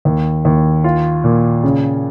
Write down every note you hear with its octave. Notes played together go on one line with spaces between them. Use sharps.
D#2
D#2
F4
A#2
C#3